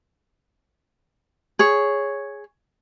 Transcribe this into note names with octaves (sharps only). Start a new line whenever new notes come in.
G#4 C#5